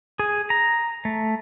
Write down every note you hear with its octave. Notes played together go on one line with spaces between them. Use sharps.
G#4
A#5
A3